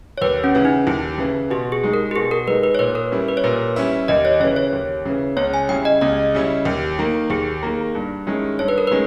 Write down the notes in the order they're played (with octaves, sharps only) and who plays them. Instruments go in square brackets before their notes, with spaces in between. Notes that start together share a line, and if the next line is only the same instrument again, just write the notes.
[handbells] C#5
[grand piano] D#2 [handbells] B4
[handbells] C#4
[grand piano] C#3 E3
[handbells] D#4
[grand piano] D#2 [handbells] E4
[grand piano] C#3 E3
[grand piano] B2 [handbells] G4
[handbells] G#4
[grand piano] G#3 D#4
[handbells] A#4
G4
[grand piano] B2 [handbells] G#4
[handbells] A#4
[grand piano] G#3 D#4 [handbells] B4
[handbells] B4
C#5
[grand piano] A#2 [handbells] B4
[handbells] A#4
[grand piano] G3 C#4 E4
[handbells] B4
C#5
[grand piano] A#2 [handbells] B4
[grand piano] G3 C#4 E4
[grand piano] D#2 [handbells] D#5
[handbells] C#5
[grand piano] C#3 E3 [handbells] C#5
[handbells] C#5
[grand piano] D#2
C#3 E3
[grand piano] C#2 [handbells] C#5
[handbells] G#5
[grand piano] C#3 G3 C#4 E4 [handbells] G5
[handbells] D#5
[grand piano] C#2 [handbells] D#5
[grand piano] C#3 G3 C#4 E4
D#2
D#3 A#3
[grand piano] D#2 [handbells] G#4
[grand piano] D#3 A#3
G2
D#3 G#3 C#4 E4
[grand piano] G2 [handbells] C#5
[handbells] B4
A#4
[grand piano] D#3 G#3 C#4 [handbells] B4